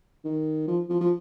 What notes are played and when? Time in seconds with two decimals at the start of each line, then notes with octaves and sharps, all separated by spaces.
0.25 D#3
0.68 F3
0.89 F3
1.01 F3